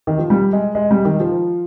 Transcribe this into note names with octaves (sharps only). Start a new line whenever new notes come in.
D#3
F3
G3
G#3
G#3
G3
D#3
F3